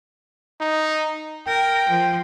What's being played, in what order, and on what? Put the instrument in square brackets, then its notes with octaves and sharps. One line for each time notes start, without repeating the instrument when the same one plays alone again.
[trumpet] D#4
[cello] A#4 [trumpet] G5
[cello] F3